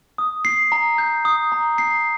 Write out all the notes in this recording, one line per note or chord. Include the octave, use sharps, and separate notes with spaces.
D#6
C7
A#5
G6
D#6
A#5
C7